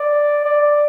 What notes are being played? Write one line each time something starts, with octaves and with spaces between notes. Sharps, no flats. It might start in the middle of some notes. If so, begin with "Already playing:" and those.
Already playing: D5
D5